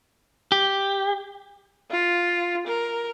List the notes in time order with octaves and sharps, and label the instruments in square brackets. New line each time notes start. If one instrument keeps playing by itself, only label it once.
[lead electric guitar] G4
[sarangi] F4
A#4